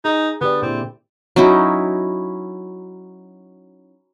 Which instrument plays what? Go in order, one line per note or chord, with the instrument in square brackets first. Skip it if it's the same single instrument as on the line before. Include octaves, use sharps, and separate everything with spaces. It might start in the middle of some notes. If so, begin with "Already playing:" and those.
[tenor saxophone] D#4 [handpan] G#4
[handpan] D3 G4 D5 [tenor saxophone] B3
[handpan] A#2 E4 [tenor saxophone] C4
[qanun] F#3 C#4 D#4 E4